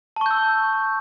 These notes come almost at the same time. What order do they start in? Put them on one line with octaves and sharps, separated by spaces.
A5 C#6 G6 E6